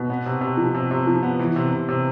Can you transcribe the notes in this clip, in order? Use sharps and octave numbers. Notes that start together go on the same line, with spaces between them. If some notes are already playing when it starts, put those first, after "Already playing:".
Already playing: B2
B3
C3
C3
F3
C3
C3
F3
B3
E3
C3
C3
C3